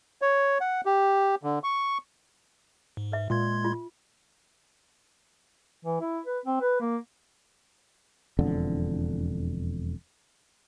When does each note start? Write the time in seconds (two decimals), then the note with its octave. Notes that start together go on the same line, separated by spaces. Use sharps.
0.22 C#5
0.61 F#5
0.86 G4
1.43 D3
1.64 C#6
2.97 G#2
3.12 B4 E5
3.30 A#2 G#3 C6 G#6
3.65 F4
5.85 E3
6.01 E4
6.26 B4
6.46 C4
6.61 B4
6.80 A#3
8.39 E1 F2 D3